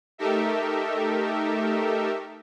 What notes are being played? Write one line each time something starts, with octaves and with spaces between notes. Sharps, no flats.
A3 D#4 G4 A4 A#4 E5